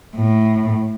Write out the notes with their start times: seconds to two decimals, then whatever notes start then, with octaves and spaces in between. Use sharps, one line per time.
0.13 A2